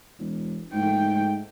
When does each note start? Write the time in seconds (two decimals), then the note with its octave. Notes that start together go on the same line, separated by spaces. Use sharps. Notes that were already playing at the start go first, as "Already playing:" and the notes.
0.19 E1
0.74 G#2 A3 G5